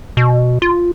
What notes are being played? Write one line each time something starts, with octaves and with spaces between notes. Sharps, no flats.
B2
F4